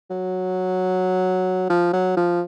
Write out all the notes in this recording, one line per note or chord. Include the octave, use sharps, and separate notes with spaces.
F#3
F3
F#3
F3